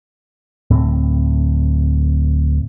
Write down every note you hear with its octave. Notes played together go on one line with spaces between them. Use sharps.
D1 A2 C4